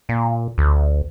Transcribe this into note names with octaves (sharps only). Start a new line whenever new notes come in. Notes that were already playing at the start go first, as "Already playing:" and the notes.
A#2
D2